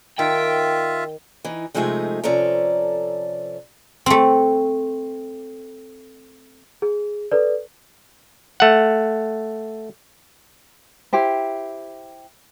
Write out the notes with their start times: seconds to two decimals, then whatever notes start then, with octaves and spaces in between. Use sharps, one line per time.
0.19 D#3 F4 E5 G5
1.45 E3 D#4
1.74 C3 F3 G#3 A3 D#4 G#4
2.24 C3 F3 C#4 A4 D5 A#5
4.06 A3 C4
6.82 G#4
7.32 A4 B4 D5
8.60 A3 F#5
11.13 E4 G4 C5